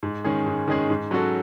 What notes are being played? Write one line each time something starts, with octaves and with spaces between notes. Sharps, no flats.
G#2
D#3 G#3 C#4 G#4
G#2
D#3 G#3 C#4 G#4
G#2
F#3 C#4 F#4 A4